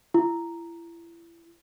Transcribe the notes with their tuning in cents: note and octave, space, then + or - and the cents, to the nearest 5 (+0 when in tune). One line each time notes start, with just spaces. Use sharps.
E4 +35